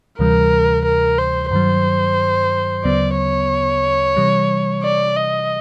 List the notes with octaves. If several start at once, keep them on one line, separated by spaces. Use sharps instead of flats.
D2 C3 E3 G3 A#4
A#4
C5
G2 D#3 F#3 C5
D2 C#3 F#3 B3 D5
C#5
C3 E3 G3
D5
D#5